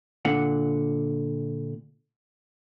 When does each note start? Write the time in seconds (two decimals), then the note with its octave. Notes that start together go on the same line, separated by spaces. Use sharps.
0.25 A#2 D3 F#5